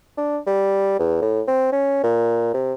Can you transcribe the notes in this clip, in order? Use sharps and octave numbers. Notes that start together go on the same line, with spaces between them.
D4
G3
E2
A2
C4
C#4
A#2
C3